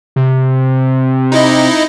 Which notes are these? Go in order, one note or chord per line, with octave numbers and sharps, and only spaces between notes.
C3
D#4 E4 D#5